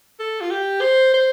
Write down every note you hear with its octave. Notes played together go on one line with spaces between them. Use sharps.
A4
F4
G4
C5
C5